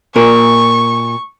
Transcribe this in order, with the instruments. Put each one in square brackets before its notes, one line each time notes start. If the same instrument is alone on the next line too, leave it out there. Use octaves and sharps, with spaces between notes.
[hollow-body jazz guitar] A#2 A#4 [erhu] C#6